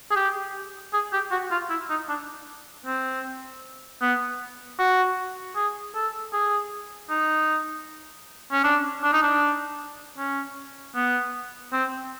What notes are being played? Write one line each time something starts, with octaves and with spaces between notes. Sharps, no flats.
G#4
G4
G#4
G4
F#4
F4
E4
D#4
D4
C4
B3
F#4
G#4
A4
G#4
D#4
C#4
D4
D4
D#4
D4
C#4
B3
C4